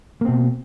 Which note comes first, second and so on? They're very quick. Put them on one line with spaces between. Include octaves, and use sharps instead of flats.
A#3 C4 B2